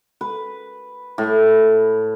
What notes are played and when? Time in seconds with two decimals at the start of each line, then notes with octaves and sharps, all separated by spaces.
0.21 B4
1.18 A2